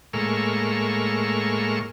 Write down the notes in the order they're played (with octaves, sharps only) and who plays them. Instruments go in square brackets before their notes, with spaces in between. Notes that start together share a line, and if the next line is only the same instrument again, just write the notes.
[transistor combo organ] A2 G#3 A#3 C#6 E6 F6